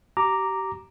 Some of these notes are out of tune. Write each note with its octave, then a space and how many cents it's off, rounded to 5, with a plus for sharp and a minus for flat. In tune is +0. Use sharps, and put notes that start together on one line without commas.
G4 -30 A#5 -5 D6 +0